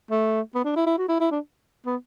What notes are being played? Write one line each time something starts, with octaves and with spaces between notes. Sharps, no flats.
A3
B3
D4
E4
E4
F#4
E4
E4
D4
B3